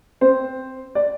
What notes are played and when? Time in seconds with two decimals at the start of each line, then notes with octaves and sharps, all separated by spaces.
0.21 C4 C5
0.95 D5